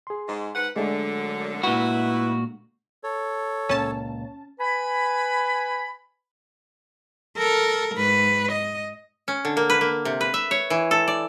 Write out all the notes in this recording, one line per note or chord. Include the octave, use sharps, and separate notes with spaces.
G#4 C6
G#2
G#2 B4 F#5
F#2 D3 G#3 A3 D4
A#2 E4 F#4 B4
A4 C#5
C#2 A#2 C#4 A5
B4 G#5 B5
A4 A#4
G#2 B4
D#5
C#4
D3
A#3
B4
A#3
C3
B4
E5
C#5
E3
A4
D5